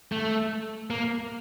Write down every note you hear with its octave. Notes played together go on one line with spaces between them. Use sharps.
A3
A#3